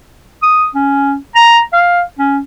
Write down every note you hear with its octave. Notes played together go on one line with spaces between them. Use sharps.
D#6
C#4
A#5
F5
C#4